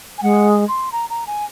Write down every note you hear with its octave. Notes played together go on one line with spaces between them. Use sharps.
G#5
G#3 F#5
C6
A#5
A#5
G#5